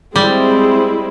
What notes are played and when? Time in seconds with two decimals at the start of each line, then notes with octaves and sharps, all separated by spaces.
0.16 G3 G#3 C4 E4